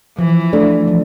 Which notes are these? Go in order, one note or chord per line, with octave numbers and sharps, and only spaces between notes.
E3 F3
A3 D4 A4 D5
F3